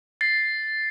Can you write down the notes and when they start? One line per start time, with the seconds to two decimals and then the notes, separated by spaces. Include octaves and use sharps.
0.21 A6 C7